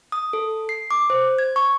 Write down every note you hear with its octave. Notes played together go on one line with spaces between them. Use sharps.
D#6
A4
C7
D6
C5
G#6
C#6